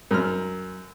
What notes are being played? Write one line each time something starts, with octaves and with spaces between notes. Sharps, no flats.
F#2 F6